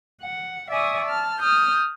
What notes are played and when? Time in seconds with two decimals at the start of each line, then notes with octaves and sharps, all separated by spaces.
0.24 F#5
0.72 D5 E5 G#5 C#6 D#6
1.07 A5 F6
1.40 D#6 F6 G6